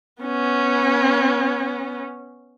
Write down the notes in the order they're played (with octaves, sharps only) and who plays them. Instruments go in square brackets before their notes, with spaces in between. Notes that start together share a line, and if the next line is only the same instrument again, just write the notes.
[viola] B3 C#4